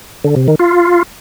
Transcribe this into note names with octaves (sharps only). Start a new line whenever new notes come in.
D3
C3
D#3
F4